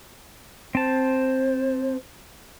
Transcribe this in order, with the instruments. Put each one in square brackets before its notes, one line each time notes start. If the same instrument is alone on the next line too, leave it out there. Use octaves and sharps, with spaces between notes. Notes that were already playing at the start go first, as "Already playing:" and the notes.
[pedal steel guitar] C4 A5 [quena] C5